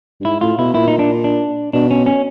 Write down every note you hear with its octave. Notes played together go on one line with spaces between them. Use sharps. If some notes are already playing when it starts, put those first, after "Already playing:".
G2
G#2 E4
A2 F4
B2 E4
A#2 E4
D#4
D4
D4
B2 D4
C#4
C#4